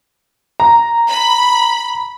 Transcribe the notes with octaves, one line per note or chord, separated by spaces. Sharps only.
A#5
B5